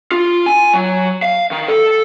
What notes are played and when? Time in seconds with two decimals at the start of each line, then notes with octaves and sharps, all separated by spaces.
0.12 F4
0.46 G#5
0.74 F#3
1.22 F5
1.51 D#3
1.68 A4